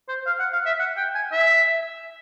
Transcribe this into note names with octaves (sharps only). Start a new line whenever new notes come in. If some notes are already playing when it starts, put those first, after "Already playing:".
C5
F5
F#5
F5
E5
F#5
G5
G#5
E5